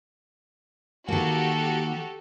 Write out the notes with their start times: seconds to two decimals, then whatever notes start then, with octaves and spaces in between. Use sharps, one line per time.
1.08 D#3 A#3 F#4 G4 A4